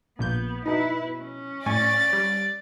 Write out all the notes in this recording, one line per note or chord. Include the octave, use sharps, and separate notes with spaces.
A#1 A#2 B3 G6
B2 D#4 E4 B4
C#4
A2 D5 G#5 C#6 A6
G3